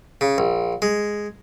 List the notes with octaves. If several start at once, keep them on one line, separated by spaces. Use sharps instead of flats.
C#3
A#1
G#3